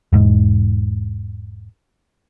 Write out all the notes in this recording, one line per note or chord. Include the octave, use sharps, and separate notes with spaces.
E1 G#2